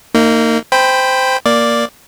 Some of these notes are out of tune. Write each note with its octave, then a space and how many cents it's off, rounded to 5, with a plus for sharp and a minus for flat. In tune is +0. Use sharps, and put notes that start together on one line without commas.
A#3 -25 D#4 +0
C5 -15 G5 +10 B5 +0
A#3 +0 D5 +0